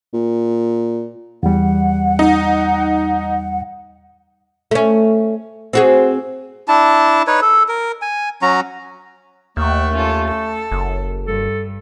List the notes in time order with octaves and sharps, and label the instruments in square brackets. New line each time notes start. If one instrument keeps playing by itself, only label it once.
[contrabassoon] A#2
[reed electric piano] E2 G3 [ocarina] F#5
[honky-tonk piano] D#4
[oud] A3 C#4
C4 F#4 G#4
[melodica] D4 E4 A5
D#4 B4 C#5
A4
A#4
G#5
F#3 C#4 F#4 A#5
[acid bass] D#2 [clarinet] A3 [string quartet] E5 F#5 G5
[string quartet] C#4 F4 A4
A4
[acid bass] F#1
[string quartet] G2 [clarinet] A4